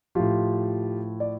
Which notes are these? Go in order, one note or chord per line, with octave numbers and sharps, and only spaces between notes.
A2 F3 F4 G4
D5